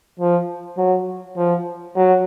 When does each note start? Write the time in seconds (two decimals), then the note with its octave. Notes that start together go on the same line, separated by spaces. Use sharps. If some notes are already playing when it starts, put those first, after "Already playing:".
0.19 F3
0.77 F#3
1.37 F3
1.96 F#3